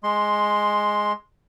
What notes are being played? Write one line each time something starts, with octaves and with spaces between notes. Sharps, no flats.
G#3 C6